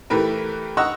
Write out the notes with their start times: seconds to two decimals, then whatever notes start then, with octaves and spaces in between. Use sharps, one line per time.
0.10 E3 A3 G4 A#4 B4
0.77 D#5 F#5 A#5 C#6 E6